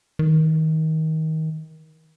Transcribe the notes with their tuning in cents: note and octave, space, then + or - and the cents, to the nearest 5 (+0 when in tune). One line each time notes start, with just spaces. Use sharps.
D#3 +25